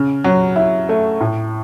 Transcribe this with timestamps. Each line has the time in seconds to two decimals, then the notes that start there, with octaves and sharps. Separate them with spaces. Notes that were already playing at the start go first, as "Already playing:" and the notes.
Already playing: C#3
0.24 F#3
0.56 E4
0.89 A3
1.21 A2